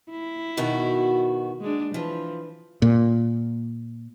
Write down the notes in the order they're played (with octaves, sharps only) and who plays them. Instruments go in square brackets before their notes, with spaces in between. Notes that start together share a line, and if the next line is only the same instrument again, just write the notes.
[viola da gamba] E4
[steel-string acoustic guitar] B2 D#3 F#4
[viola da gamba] G#3 D4
[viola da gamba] E3 [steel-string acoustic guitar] F3
[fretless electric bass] A#2